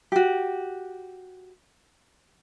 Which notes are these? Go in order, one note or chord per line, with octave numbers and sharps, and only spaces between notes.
F#4 G4